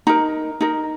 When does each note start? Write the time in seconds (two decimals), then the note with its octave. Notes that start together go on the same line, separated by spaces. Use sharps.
0.07 D#4 A#4 A#5
0.61 D#4 A#4